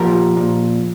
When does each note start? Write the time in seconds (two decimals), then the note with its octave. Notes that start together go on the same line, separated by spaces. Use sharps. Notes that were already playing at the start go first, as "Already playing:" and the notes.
Already playing: A#2 F3 G4 A#4
0.37 A#2